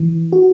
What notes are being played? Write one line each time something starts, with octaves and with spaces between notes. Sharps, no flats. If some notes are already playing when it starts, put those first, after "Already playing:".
Already playing: E3
F#4